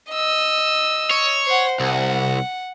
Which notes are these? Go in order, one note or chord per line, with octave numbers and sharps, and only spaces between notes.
D#5 E6
C#5
C5 F#5
C2 F#5